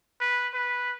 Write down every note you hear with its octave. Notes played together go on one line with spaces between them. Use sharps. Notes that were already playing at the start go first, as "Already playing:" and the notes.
B4
B4